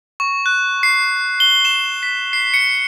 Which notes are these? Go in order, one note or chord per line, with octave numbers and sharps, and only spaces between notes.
C#6
F#6
C7
G7
E7
B6
C7
C#7